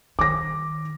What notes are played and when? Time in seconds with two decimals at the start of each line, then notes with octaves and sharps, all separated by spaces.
0.19 D#3 D6 A#6